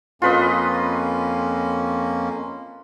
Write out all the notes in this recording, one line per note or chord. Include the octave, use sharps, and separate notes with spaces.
F2 A#3 C#4 F4 B4 D#5